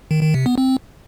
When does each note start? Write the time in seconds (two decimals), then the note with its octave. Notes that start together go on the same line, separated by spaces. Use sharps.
0.11 D#3
0.22 D#3
0.34 C3
0.46 B3
0.58 C4